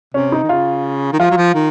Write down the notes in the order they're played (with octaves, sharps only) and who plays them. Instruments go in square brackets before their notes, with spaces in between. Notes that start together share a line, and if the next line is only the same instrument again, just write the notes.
[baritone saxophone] C3 [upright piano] C#4
[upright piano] D#4
[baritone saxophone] D#3
[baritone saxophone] C#3 [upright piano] F4
[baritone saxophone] D#3
[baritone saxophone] F3 [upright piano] F4
[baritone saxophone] F#3
F3
D#3